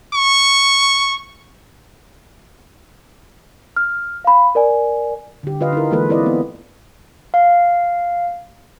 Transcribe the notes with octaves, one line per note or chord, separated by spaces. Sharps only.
C#6
F6
F5 B5
A#4 D5 G#5
D3 G4
D3 F4 B4 D#5 F5
D#4 E4 A#4
E3 G#3 A#3 F4 A4 B4
C4 E4 B4 D5 D#5
B3
F5